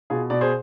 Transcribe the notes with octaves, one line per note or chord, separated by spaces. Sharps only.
B2 F4 G#4
B2 D5
G#4 C5